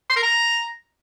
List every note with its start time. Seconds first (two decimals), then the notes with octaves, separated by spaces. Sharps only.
0.10 C6
0.16 A#4
0.23 A#5